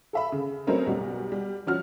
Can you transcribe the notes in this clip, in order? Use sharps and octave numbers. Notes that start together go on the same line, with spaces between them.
A4 E5 B5
C#3
F#3 A3 C4 C#4 A#4 D#5
B1 G3 F#4
G3
F3 C#4 F#4 F6